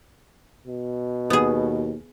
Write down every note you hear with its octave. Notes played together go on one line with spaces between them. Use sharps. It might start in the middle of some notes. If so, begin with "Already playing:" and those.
B2
D#2 B3 G#4